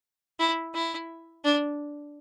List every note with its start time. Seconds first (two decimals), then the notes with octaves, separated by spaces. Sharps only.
0.39 E4
0.74 E4
1.44 D4